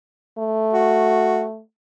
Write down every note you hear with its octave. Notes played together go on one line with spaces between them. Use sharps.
A3
F#4